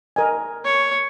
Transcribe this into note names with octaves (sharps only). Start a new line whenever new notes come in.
A#4 D#5 G#5
C#5